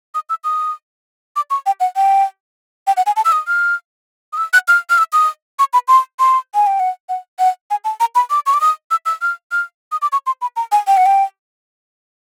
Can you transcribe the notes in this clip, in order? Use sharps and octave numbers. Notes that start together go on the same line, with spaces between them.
D#6
E6
D#6
D6
C#6
G5
F#5
G5
G5
F#5
G#5
A5
E6
D#6
F6
D#6
E6
F#6
F6
F6
E6
D#6
C#6
B5
C6
C6
G#5
G5
F#5
F#5
F#5
G#5
A5
A#5
B5
D6
C#6
D6
D#6
E6
E6
F6
F6
D#6
D6
C#6
C6
B5
A#5
G#5
G5
F#5
G5